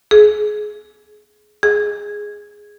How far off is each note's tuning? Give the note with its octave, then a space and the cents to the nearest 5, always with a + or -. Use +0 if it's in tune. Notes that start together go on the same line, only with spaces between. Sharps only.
G#4 +25
G#4 +0